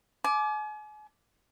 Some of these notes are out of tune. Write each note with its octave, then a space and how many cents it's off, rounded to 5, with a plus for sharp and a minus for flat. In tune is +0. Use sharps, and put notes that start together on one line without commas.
G#5 +40 D6 +0